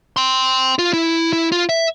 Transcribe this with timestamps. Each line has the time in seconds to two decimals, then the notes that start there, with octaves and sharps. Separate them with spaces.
0.17 G5 C6
0.79 F4
0.93 E4
1.33 E4
1.52 F4
1.69 E5